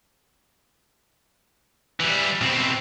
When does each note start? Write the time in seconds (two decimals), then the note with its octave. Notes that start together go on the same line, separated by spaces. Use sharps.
2.00 E3 G3
2.41 B2 C4